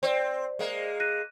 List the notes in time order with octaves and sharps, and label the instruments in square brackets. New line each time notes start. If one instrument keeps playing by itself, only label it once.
[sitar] C4 [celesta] C5 D5
[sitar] G#3 A#3
[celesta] F#6 A#6 D#7